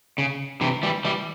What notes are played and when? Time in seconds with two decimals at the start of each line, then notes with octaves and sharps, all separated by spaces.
0.18 C#3
0.61 C3 E3
0.83 E3 G3
1.05 E3 G3